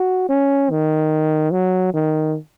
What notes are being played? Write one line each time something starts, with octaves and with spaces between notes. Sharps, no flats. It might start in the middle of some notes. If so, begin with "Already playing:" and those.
Already playing: F#4
C#4
D#3
F#3
D#3